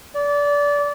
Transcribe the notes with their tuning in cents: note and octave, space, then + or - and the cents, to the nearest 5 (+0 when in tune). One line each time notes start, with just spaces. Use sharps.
D5 -25